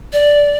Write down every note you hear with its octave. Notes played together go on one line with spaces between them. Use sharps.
D5